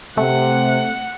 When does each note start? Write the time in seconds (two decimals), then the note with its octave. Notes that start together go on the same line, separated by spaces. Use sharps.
0.17 C3 A3 F#5